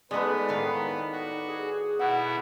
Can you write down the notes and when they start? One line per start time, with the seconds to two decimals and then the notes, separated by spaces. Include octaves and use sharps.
0.11 G#3 A3 B3 D#4 B4 D5
0.49 A2 D#3 F5
1.12 F#4
1.48 G#4
1.99 B2 E4 F#5